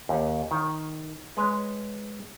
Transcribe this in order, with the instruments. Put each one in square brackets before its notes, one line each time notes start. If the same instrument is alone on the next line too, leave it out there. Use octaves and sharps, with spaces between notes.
[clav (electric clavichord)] D#2
D#3
G#3 B4 C#5